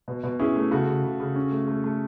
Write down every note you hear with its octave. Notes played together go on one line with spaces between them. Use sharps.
B2
B2
C#4 E4 G#4
A3
C#3 F#4 A4
C#3
C#3
C#3
C#4
A3
A3
A3